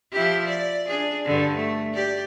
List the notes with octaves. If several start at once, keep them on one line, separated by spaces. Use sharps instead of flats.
F3 E4 G4
D5
D4 G#4
G2 D3
A3
G4 D5